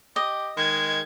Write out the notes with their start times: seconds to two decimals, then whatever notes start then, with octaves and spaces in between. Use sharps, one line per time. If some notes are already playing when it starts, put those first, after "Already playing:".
0.16 G4 D#5
0.57 D#3 G#3 G#6